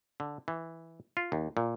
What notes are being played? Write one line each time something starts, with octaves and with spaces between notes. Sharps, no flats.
D3
E3
F4
D#2
A#2